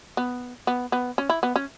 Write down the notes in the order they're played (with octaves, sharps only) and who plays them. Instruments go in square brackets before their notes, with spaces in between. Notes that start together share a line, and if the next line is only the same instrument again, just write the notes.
[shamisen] B3
B3
B3
C#4
E4
B3
C#4